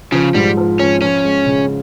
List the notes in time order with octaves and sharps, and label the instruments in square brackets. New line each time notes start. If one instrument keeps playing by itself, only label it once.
[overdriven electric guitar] C#3 [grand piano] F3
[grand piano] G#2 [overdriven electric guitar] G3
[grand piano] F3
[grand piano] F3 [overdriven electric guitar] C#4
[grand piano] F3 [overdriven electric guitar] C#4
[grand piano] G#3
C#3